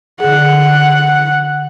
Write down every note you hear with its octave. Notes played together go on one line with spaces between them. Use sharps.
D3 G#4 F#5